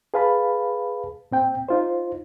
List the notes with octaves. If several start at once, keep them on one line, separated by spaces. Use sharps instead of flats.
G#4 B4 F5 A5 B5
A#2 C4 G5
D#4 F4 C5